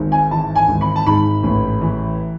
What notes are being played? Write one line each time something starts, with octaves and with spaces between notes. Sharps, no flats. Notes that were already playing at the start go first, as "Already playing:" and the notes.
Already playing: G#1 G#2
G#5
E3 A5
G#5
G#1
B5
A5
G#2 B5
A1
E3